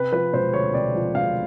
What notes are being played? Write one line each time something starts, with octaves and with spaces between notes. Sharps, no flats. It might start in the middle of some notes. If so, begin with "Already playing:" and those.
Already playing: C3 B4
F3 B4
E1 C5
D2 C#5
C3 D5
F3
E1 F5